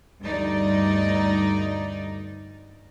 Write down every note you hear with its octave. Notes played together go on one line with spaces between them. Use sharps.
D2 G2 D#4 D5